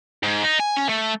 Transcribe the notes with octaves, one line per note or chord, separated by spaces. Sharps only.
G#2
D#4
G#5
C#4
A3